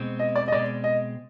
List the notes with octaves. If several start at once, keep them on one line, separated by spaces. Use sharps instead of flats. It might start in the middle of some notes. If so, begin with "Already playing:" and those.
Already playing: B2 G#3 C4
D#5
D5
D#5
B2 G#3 C4 D5
D#5